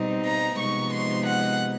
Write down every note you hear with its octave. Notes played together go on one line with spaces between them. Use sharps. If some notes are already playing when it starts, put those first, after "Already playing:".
Already playing: B2 G3 C4 D#4
A#5
C3 F3 G#3 B3 D#4 C#6
C6
F#5